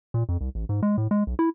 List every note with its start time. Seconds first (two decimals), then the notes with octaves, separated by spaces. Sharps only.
0.14 A#2
0.29 F2
0.41 C2
0.55 A1
0.69 G#2
0.83 G#3
0.98 A2
1.11 G#3
1.27 B1
1.39 E4